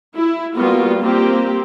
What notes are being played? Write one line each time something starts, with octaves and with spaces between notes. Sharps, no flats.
E4
G3 A#3 B3 F4 F#4
A#3 C4 G4